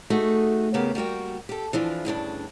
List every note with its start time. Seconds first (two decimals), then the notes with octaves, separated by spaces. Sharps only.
0.10 A3 D#4 F#4 G#4
0.74 C#3 A#3 B3 G4
0.95 G3 A#3 F#4 G5
1.49 G4 A4
1.73 E3 F3 D4 F4
2.05 D2 G2 C#3 D4